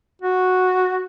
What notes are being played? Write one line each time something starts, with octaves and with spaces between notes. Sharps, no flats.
F#4